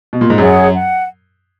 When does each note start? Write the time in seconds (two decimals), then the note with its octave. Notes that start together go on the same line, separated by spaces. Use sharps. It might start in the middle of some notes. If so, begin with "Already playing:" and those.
0.13 B2
0.21 A#2
0.30 G#2
0.38 F#2 G#4 C#5 F#5
0.75 F#5